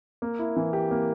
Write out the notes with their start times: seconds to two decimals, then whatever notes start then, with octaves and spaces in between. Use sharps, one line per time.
0.22 A#3
0.39 E4
0.56 E3
0.73 G4
0.91 A#3